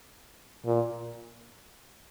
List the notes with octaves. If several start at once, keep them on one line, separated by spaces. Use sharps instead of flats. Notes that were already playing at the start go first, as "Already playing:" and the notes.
A#2